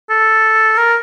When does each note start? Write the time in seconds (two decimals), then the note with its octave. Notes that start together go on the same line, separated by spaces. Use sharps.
0.10 A4
0.78 A#4